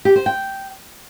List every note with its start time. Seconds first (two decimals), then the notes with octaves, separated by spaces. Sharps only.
0.05 G4
0.16 C5
0.26 G5